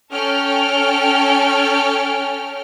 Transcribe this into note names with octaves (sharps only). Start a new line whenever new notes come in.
C#4 A4 G5 F6